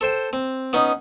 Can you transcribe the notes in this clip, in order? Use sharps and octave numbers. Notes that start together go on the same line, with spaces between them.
A4 C5 G5
C4
B3 C#4 D#4